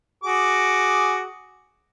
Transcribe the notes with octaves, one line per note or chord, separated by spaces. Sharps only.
F#4 G#4 D6